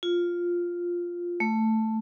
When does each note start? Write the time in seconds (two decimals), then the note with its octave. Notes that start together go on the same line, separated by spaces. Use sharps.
0.03 F4
1.40 A3